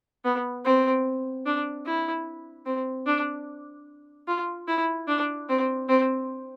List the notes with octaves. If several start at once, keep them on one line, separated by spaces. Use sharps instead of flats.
B3
C4
D4
E4
C4
D4
F4
E4
D4
C4
C4